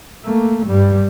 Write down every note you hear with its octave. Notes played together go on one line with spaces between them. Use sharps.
A3 A#3
G2 G3